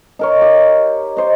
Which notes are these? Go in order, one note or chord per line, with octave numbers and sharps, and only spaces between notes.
D#4 A#4 C#5
G4
D#4 C5 D#5